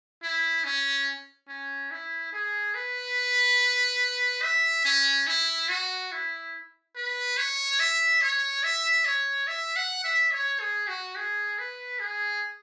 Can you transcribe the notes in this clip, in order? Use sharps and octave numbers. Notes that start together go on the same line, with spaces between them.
E4
C#4
C#4
E4
G#4
B4
E5
C#4
E4
F#4
E4
B4
C#5
E5
C#5
E5
C#5
E5
F#5
E5
C#5
G#4
F#4
G#4
B4
G#4